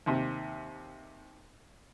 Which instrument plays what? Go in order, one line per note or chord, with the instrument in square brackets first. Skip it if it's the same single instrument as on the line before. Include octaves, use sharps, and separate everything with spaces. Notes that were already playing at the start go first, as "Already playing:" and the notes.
[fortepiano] D#2 C3